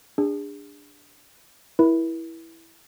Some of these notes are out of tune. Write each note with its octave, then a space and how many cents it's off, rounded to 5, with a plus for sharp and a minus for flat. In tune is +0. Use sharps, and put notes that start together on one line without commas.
D4 +0 G#4 -35
E4 +0 A#4 +45